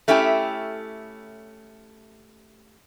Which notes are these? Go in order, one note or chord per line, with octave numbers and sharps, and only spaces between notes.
A3 C#4 E4 G4 G5